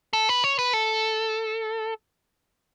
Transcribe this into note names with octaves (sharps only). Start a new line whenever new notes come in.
A4
B4
C#5
B4
A4